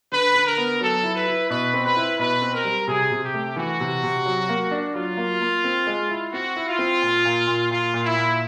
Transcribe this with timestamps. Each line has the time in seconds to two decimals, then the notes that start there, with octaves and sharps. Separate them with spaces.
0.12 D3 B4
0.35 D3
0.46 A#4
0.58 B3
0.81 F#3 A4
1.04 E4
1.15 B4
1.28 E4
1.50 B2 B4
1.74 C4
1.85 B4
1.97 E4
2.19 B2 B4
2.42 C4
2.54 A#4
2.64 G3
2.88 C3 G#4
3.12 C3
3.23 G4
3.34 A3
3.56 E3 F#4
3.80 C3
4.04 C3
4.26 F#3
4.49 A#3
4.71 D4
4.94 F#3 F4
5.17 A#3
5.41 A#3
5.64 C4
5.87 G#3
6.09 E4
6.33 C4 F#4
6.56 E4
6.67 F4
6.79 C4
7.02 A#2
7.25 A#2
7.47 A#2
7.71 A#2 F4
7.94 A#2
8.05 E4
8.16 A#2